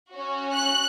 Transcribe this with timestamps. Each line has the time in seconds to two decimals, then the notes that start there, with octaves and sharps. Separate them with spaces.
0.12 C#4 F#4
0.54 F#6